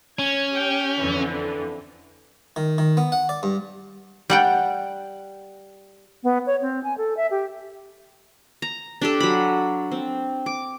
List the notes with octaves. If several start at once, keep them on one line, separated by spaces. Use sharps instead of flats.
C#4 G#6
G4 G5
F2 D3 E3
D#3
D#3
B3
F#5
D5
G2
G3 F#5 G5
B3
C#5
C4
G#5
A4
E5
G4
A#5
D4 G4 A4
F#3 B5
C4
D6